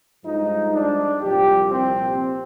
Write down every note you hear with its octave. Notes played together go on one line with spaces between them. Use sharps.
G2 F3 G#3 D#4
D4
C2 A#2 F3 G4
C4